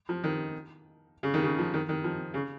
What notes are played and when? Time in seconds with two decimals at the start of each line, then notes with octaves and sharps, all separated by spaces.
0.09 F3
0.24 D#3
1.23 C#3
1.34 D#3
1.44 C#3
1.59 F3
1.74 D#3
1.89 D#3
2.04 F3
2.34 C#3